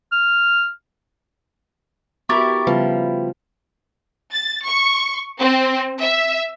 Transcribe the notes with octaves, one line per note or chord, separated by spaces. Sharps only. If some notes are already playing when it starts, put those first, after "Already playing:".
F6
B3 E4 F#4 G4 A#4 C#6 D6 A6
C#3 F3 G3 B3 B4
A6
C#6
C4
E5